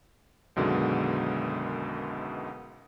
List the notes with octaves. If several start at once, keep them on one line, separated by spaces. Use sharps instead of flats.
B1 F#2 B2 D3 D#3 G#3